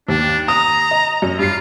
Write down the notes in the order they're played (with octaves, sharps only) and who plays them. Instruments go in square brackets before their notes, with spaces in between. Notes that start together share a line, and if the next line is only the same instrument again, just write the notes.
[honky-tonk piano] D#2 [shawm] D4
[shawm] A#5 [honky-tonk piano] D#6
[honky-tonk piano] D#5
F#2
[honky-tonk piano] G2 C7 [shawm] F4